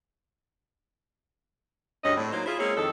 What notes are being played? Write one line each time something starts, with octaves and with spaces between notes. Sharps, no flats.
D2 G2 C#4 G#4 D#5
A2 C4 D4
F#3 A#3 D#4 C5
E4 F4 G#4
G#3 A#3 C4 C#4 E4 G#4
F2 D#3 A4